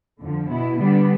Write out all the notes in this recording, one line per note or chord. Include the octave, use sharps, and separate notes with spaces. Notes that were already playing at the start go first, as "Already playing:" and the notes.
F2 D3 F3
B2 B3 E4
D3 G3 B3 D4